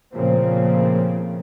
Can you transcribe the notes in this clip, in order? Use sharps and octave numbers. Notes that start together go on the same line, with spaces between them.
A#2 C#3 F3 A3 A#3 C4